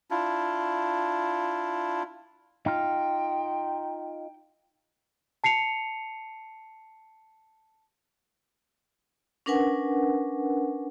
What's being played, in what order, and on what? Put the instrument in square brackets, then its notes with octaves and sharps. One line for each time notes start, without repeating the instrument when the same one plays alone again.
[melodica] D4 E4 F4
[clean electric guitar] D#4 F4 [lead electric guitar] G5
[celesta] A5 C7 C#7 F7
[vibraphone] C#4 D4 A#4 B4 F#5 G#5